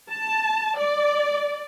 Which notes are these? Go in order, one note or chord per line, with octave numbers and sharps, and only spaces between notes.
A5
D5